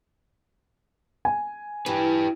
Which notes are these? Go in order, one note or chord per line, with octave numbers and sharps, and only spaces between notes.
G#5
E3 G4 B4